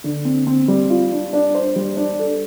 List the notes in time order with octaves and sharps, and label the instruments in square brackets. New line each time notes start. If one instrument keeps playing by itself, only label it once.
[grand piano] D3
C4
C4
G3
F4
D4
D4
C5
G3
D4
A4